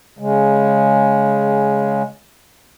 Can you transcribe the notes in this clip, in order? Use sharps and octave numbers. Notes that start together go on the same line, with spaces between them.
C#3 G#3